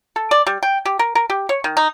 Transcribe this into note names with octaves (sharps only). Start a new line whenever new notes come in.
A4
D5
G3
G5
G4
A#4
A#4
G4
C#5
D#3
D#4